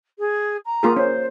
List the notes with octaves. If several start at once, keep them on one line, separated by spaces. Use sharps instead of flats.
G#4
A#5
A#3 F4 G#4
C#4 C5